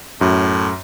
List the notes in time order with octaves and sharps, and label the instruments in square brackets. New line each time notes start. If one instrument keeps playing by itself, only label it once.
[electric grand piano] F#2 [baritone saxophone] A2